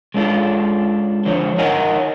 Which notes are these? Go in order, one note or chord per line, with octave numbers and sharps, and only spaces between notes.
G#3 C#4 D4 F4 A4
D3 F3 C5 C#5
D#4 A#4 C#5 D#5 F#5 G#5